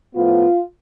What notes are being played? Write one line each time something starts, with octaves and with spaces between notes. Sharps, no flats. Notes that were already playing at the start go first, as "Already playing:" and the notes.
A2 F3 B3 F4